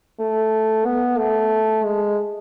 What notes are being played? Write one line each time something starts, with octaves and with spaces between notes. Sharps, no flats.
A3
B3
A3
G#3